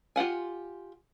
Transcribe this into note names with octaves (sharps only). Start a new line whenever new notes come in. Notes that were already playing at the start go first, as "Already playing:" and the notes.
F4 G4 F#5 G#5